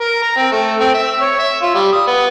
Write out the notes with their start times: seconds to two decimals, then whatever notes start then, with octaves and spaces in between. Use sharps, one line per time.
0.01 A#4
0.22 A#5
0.37 C4
0.53 A3
0.80 C4
0.95 E5
1.22 C#5
1.39 E5
1.63 F4
1.75 G3
1.93 D#6
2.08 B3